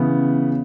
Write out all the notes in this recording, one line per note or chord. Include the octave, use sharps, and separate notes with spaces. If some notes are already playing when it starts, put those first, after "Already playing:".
Already playing: C#3 E3 B3